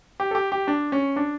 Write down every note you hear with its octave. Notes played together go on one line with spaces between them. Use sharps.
G4
A4
G4
G4
D4
C#4
D4